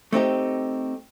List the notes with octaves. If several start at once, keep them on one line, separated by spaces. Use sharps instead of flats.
A3 C4 D#4 G4